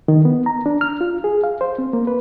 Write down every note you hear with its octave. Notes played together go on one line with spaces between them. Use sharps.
D#3
B3
A#5
D4
F6
F4
G#4
F5
C5
C4
A#3
B4